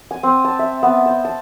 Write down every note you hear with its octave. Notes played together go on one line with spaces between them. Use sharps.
G#5
C4
A5
E5
B3
C5
A5